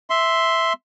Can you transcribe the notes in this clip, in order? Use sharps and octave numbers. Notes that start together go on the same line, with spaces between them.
E5 C6